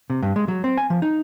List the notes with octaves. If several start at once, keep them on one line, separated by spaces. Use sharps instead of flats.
C3
G2
G#3
F#3
C4
G#5
F3
D#4